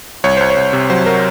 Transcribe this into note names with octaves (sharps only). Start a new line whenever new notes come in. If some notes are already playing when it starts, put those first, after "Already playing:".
C2 C#5
C2 C5
C#5
C2
C3
F#3 C5
F#3 A#4